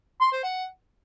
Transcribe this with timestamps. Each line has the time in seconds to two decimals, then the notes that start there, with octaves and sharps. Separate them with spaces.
0.21 C6
0.32 C5
0.43 F#5